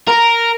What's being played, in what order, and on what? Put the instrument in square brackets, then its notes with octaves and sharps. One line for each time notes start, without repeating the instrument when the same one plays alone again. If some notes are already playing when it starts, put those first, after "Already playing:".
[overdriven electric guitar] A#4